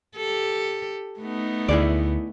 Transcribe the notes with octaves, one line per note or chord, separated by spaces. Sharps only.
G4 A4
A3 B3 D#4
D2 E4 G#4 D5